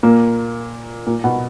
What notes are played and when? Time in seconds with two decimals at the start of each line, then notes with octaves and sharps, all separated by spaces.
0.03 A#2 A#3
1.07 A#2 A#3
1.24 B2 B3